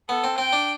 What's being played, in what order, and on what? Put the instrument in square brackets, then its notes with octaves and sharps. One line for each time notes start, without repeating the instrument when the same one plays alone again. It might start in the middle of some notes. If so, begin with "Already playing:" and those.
[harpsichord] B3 [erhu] A4
[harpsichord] C4
[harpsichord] C4 [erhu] G5
[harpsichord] D4